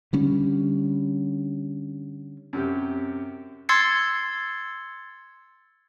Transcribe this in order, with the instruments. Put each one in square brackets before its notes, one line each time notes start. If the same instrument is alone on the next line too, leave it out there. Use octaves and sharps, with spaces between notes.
[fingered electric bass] D3 G3 C#4
[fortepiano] F#2 C3 G4
[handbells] C6 E6 G#6 A6 C7 C#7